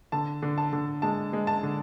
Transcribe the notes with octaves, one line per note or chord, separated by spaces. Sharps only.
D3 A5
D3
A5
D3
G#3 A5
G#3
A5
D3